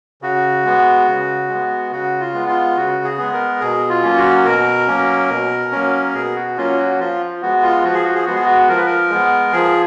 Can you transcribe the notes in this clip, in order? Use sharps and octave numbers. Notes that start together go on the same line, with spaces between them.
C#3 F#4
G#3 B3
C#3
G#3 B3
C#3 F#4
F4
G#3 B3
F4
C#3 F#4
G#4
G#3 B3
A#4
B2 G#4
F4
F#3 A#3 C#4
F#4
B2 A#4
F#3 A#3 C#4
B2
F#3 A#3 C#4
B2 G#4
F#4
F#3 A#3 C#4 F4
F#4
F3 F4
G#3 B3 F#4
F4
F3 F#4
G#4
F#4
G#4
G#3 B3 F#4
G#4
F#4
F3 A#4
B4
A#4
G#3 B3
F3 G#4